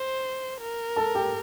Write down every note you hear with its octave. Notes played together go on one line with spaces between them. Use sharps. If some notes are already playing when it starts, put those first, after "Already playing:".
Already playing: C5
A#4
A4 A5
G4 G5